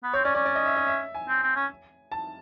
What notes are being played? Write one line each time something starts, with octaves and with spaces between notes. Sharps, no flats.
B3
C4 C#5
C#4 D5
C#4 D5
D5
D#5
E5
D#5
E5
G#5
C4
C4
C#4
A5